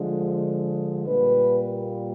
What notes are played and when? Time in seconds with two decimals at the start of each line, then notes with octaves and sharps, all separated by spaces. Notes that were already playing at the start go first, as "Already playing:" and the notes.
Already playing: D3 F3 G#3
1.07 A#2 G3 A#3 B4